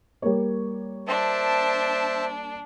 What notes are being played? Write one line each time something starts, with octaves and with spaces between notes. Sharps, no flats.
G3 A#3 C#5
D4 C5 E5 A5